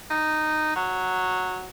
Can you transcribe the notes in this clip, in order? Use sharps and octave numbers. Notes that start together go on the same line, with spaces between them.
D#4
F#3